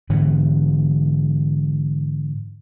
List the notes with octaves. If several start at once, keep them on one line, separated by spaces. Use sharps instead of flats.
G#2 D3 E3 B3